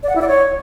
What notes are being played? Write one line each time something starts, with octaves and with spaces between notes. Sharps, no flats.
D5
F#5
E4
D5
C#5